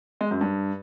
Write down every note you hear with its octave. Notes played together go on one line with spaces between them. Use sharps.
G#3
F#2
G2